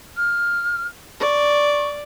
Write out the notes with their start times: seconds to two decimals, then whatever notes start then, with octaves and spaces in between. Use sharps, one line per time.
0.16 F6
1.20 D5 C#6